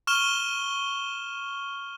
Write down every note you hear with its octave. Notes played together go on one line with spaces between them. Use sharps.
C#6 F6 E7 G7